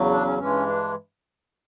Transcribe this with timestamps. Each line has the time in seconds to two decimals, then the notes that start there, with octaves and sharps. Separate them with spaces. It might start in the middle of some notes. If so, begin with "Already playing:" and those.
Already playing: E2 C#3 F#3
0.11 D4
0.25 C#4
0.38 G2 E3 G#3 C#4
0.67 D4